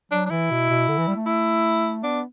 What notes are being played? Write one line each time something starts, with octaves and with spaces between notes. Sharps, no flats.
F#3 D4
D4
E3 E4
B2
B2
D3
E3
G3
A3
E4
B3 D4